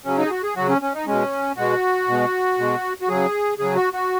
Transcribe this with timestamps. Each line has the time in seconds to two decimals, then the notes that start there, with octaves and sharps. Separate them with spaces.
0.05 C#3 F#3 C#4
0.18 D#4
0.25 G#4
0.30 F#4
0.43 G#4
0.56 C#3 F#3 F#4
0.69 C#4
0.82 C#4
0.94 D#4
1.06 B2 G#3 C#4
1.57 B2 G#3 F#4
2.08 B2 G#3
2.58 B2 G#3
3.01 F#4
3.09 C#3 F#3 G#4
3.59 C#3 F#3 G#4
3.76 F#4
3.93 F#4